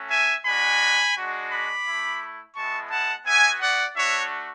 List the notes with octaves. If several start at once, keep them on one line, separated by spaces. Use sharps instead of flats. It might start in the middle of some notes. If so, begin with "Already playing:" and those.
Already playing: A3 C#4 F#4
E5 G#5
G#3 D4 F#4 G#5 B5
G#3 D4 F#4
B5 D6
A3 E4
G#3 B3 E4 A5 C#6
F#5 A5
B3 F#4 E5 G#5
D5 F#5
A3 D4 F#4 C#5 E5